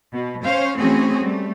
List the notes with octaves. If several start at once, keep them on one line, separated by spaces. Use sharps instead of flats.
B2
C#4 C5 C#5 F5
E3 A3 C4 C#4 F#4 G#4
G3 A3